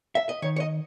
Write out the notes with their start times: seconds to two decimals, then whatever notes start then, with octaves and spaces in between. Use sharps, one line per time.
0.15 E5
0.29 D#5
0.42 D#3 C#5
0.56 C#5
0.60 D#5